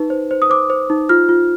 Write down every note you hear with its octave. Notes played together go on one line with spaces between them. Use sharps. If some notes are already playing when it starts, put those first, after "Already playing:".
Already playing: D#4 B4
C5
C5
D#6
C5 D6
C5
D#4
F4 F6
F4